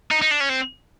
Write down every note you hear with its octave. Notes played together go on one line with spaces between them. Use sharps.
D#4
D#4
D4
C#4
C4